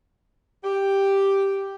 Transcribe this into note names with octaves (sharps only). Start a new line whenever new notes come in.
G4